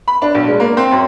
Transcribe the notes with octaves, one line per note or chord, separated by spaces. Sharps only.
B5
D4
B1
G#3
A#3
C4
F#2